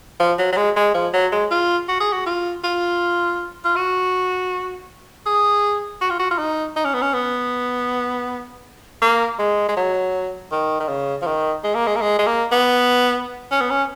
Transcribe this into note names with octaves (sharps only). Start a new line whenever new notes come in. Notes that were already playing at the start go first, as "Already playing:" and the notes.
F3
F#3
F#3
G#3
G#3
F3
F#3
G#3
F4
F#4
G#4
F#4
F4
F4
F4
F#4
G#4
F#4
F4
F#4
F4
D#4
D#4
C#4
B3
C#4
B3
A#3
G#3
G#3
F#3
D#3
D#3
C#3
F3
D#3
G#3
A#3
G#3
A#3
G#3
G#3
A#3
B3
C#4
B3
C#4